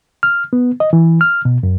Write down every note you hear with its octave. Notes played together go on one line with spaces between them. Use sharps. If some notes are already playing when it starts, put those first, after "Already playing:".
F6
B3
D#5
E3
F6
B2
F#2